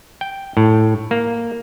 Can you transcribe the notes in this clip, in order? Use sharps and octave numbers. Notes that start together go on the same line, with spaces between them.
G5
A2
A#3